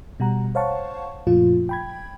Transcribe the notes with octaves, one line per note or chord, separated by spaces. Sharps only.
B2 G3 F#5 A#5
C5 C#5 F5 F#5 A5 C#6
F#2 A#2 F3 A3 F4
G5 B5 G#6